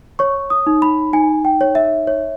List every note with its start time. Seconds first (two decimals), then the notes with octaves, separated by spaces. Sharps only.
0.19 C#5 C#6
0.50 D#6
0.67 D#4
0.82 B5
1.13 D#4 G#5
1.45 G5
1.61 C#5
1.75 E5
2.07 C#5